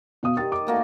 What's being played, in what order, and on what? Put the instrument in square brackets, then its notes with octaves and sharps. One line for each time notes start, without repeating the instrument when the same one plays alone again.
[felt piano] B2 F5 D#6
[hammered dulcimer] D#3 [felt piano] G4 A6
[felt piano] D6
[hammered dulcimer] A3 A#3 F#4